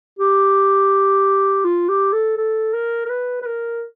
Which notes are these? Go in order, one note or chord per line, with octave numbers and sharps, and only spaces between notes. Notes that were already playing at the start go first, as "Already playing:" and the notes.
G4
F4
G4
A4
A4
A#4
A#4
B4
B4
A#4